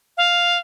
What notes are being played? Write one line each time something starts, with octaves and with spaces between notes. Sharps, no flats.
F5